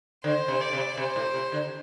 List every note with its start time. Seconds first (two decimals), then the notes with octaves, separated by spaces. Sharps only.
0.24 D3 C5
0.48 C3
0.61 D5
0.73 C3
0.97 C3 C5
1.16 A2
1.34 C3
1.52 D3